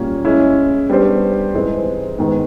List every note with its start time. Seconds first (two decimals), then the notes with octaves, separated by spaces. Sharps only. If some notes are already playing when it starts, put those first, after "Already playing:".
Already playing: A#2 G3 A#3 C#4
0.25 G#3 C#4 E4
0.89 G3 B3 D4 G4 C5
1.53 G#2 E3 G#3 C4
2.18 G#2 D#3 G#3 B3